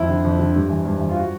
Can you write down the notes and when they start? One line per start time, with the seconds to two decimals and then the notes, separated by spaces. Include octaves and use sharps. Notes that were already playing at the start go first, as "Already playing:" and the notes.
Already playing: F2 E4
0.08 D3
0.24 F2
0.39 D3
0.54 G2
0.69 E3
0.85 G2
1.00 E3
1.09 F4
1.16 F#4